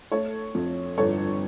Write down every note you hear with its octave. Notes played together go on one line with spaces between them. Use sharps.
A3 A4 C#5
F2
G1 A4 C#5